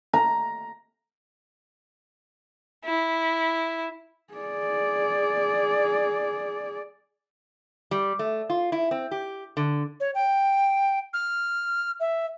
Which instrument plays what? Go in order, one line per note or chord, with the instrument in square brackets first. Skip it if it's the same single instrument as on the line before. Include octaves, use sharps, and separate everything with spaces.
[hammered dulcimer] A#5
[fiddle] E4
[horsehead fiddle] G#4 D5
[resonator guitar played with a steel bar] G3
A3
F4
E4
C4
G4
D3
[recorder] C#5
G5
F6
E5